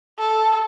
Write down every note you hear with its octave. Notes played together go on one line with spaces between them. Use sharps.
A4